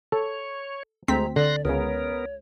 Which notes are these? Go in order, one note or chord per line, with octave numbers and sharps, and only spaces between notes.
A4 C#5
D2 G#3 C4 A#5 B6
D3 D5 C6 F#6 A#6
C#2 C#3 B3 A#4 C#5